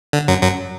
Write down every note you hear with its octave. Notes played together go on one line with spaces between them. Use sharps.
D3
F#2 F#3
F#2 F#3